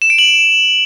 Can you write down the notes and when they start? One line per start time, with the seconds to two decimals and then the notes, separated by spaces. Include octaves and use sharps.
0.02 E7
0.10 D7
0.18 F#7